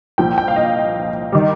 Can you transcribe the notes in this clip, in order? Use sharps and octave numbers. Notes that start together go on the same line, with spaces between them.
C2 A#2 F3 G5
G5
F5
D#5
D#3 G3